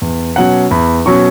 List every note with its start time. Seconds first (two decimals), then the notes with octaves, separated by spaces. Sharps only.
0.02 E2
0.36 B2 F#3 C#4 F#5
0.71 E2 B5
1.06 B2 F#3 C#4 C#6